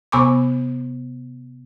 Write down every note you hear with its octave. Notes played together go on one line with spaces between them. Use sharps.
C3 B3 G#5 B5 C#6 D6